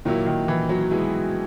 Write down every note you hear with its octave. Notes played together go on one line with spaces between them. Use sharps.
A#2 D#3 F#3 A#3 E4
D#3
E3
F#3
B2 G#3 B3 E4 G#4